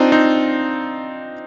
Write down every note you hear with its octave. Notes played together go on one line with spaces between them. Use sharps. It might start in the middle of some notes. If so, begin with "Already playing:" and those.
Already playing: C4 D4 D#4 F4
C4 D#4